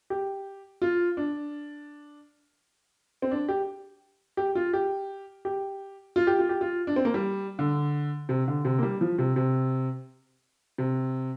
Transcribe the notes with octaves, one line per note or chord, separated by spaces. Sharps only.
G4
F4
D4
C4
D4
G4
G4
F4
G4
G4
F4
G4
F4
G4
F4
D4
C4
A#3
G3
D3
C3
D3
C3
A#3
G3
F3
C3
C3
C3